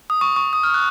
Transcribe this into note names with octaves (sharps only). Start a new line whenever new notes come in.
D#6
C#6
C#6
D#6
F6
F#6